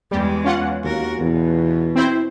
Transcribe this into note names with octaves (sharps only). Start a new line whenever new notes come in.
E2 G3 G#3
C#4 F4 F#5
D#2 F#4 A#4
E2 B2
C4 E4 C5